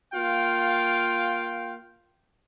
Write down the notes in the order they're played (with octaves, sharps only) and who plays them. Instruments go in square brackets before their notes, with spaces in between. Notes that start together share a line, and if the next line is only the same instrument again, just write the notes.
[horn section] A#3 F4 F5 G5